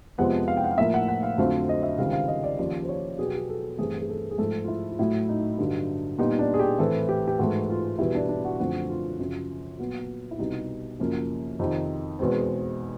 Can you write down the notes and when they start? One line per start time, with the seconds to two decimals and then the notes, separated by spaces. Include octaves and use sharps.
0.18 F2 C3 F3 G#3 B3 F#5
0.48 F5
0.57 G5
0.64 F#5
0.71 F5
0.78 A2 F3 A#3 E5
0.94 F#5
1.08 F#5
1.23 F5
1.38 F2 D3 F#3 A3 C4 F5
1.69 D#5
1.83 E5
1.98 C#2 C3 D#3 G3 F5
2.13 F5
2.28 D#5
2.44 D5
2.59 D#2 C#3 F3 D5
2.83 C5
2.89 C#5
3.18 B2 F#3 B3 G#4
3.26 G4
3.34 G#4
3.49 A4
3.79 G2 E3 A3 C4 G#4
3.99 G#4
4.09 A4
4.31 G#4
4.38 G#2 F3 A3 A4
4.64 F4
4.68 E4
4.91 F4
4.99 A2 F#3 A3 E4
5.29 D#4
5.58 G2 D3 F#3
6.19 A#2 G3 B3 D#4
6.39 D4
6.54 G#4
6.60 G4
6.79 A2 E3 A3 C4 A4
7.09 G4
7.28 G4
7.38 G#2 E3 A3 F#4
7.70 F4
7.99 E2 B2 G3 E4
8.15 D4
8.29 D4
8.45 F#4
8.60 F#2 D3 F3 A3 C4 F#4
8.89 F4
9.19 F#2 C#3 F3
9.79 A#2 F#3 B3
10.31 E4
10.39 C2 B2 G3 D#4
11.00 F#2 C#3 F3 A#3
11.59 F2 C3 D#3 D#4
12.19 E2 B2 G#3 C4